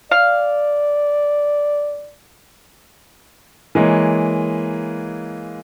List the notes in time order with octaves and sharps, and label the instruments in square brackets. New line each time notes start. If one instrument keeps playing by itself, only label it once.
[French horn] D5 [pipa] F5
[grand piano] E3 G#3 A#3 C#5